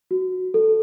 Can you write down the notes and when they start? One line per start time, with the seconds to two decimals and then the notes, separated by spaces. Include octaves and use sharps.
0.11 F#4
0.54 A4